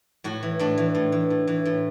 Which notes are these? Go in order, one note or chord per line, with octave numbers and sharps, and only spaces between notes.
A2 F#4
E3
A2 D4
E3
A2
E3
A2
E3
A2